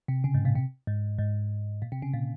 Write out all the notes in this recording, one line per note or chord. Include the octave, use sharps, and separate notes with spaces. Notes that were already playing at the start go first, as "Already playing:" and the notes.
C3
C#3
G#2
A#2
C3
G#2
G#2
A#2
C3
C#3
A#2